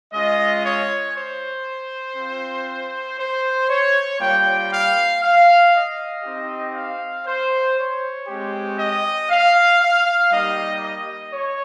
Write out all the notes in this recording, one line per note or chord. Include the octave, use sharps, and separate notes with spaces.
G#3 C#4 F4 D#5
C#5
C5
C4 F4
C5
C#5
G3 A#3 F4 G5
F5
F5
D#5
C4 D#4 G4
F5
C5
C#5
G#3 C4 G4
D#5
F5
F5
G3 A#3 D#4 G4 D#5
D#5
C#5